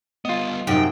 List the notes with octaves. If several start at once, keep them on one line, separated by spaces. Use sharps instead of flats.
G3 B3 F4 D#5
F#2 C3 D#4 G5